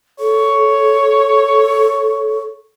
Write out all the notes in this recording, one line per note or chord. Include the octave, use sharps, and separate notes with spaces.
A4 C#5